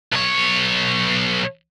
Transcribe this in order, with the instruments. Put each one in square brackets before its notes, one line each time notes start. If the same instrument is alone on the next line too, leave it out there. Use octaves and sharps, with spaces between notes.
[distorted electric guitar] B1 C#5